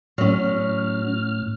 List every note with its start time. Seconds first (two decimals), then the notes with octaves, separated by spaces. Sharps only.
0.18 A2 F#3 C#4 F6